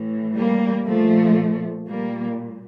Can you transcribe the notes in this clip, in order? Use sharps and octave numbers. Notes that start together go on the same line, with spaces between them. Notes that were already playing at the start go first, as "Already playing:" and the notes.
Already playing: A2 E3
G3 A#3
A#2 F3 A3
A#2 G3 A#3